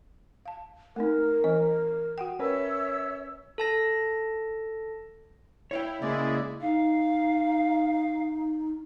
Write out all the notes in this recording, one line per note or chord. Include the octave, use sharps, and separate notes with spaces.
F5 A5
A3 C4 D#4 A#4
E3 C4 D#5
F#4 F#5 G5
C#4 A#4 B4 C#5 E5 E6
A4 A5 A#6
E4 C#5 F5 G5
C#3 G#3 A#3 E4 G#4 D5
D#4 F5